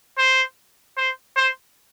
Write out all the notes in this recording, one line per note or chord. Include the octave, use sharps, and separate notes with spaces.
C5
C5
C5